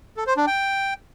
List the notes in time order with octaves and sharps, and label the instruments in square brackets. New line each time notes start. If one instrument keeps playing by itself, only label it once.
[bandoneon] A4
C5
D4
G5